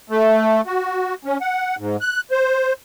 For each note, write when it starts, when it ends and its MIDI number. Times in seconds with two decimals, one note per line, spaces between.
0.10 0.61 57
0.66 1.14 66
1.25 1.37 61
1.41 1.76 78
1.78 1.96 44
2.01 2.21 90
2.31 2.73 72